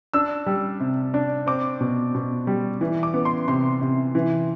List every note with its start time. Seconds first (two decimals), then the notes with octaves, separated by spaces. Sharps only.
0.14 D4 E6
0.46 G3
0.80 C3
1.14 D4
1.47 C4 D6
1.81 B2
2.14 B2
2.47 G3
2.81 E3
3.03 D6
3.14 B3
3.25 C6
3.48 C3 C6
3.81 C3
4.15 E3